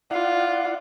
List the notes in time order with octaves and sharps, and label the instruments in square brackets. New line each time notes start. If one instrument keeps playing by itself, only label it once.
[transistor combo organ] E4 D5 F#5 [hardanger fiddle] F4